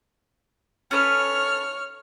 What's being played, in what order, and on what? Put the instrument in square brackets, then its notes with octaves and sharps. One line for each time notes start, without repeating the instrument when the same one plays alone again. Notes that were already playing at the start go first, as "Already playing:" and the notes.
[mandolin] C#4 A4 B4 [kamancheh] C#5 F6